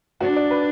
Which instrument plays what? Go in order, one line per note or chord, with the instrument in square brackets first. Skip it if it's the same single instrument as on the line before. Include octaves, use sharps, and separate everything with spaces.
[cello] D4 [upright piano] F#4
[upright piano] D5
B4